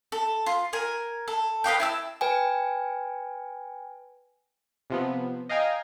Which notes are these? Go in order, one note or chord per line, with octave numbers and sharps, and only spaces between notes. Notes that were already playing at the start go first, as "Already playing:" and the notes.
A4
F4
A#4 G#5
A4
B4 D#5 F5 G5
E4 A5 E6
B4 G5 G#5
C3 F3 B3
D#5 F5 G5 G#5 A#5